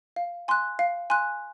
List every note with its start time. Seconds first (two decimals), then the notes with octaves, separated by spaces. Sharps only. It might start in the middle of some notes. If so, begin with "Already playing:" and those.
0.16 F5
0.48 G#5 C6 F#6
0.79 F5
1.10 G#5 C6 F#6